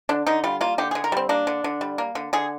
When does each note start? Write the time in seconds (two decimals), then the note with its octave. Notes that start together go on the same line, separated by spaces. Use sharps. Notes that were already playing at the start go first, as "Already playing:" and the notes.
0.09 D3 D4
0.27 D3 D#4
0.44 G3 F4
0.61 A#3 F4
0.78 D3 G4
0.91 G#4
0.95 D3
1.04 A#4
1.12 G3 C4
1.29 A#3 D4
1.47 D3
1.64 D3
1.81 G3
1.98 A#3
2.15 D3
2.33 D3 G#4